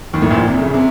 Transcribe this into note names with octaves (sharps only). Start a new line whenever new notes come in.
D#2 D#3
A1 A2
A#1 A#2
C3
C#3
C3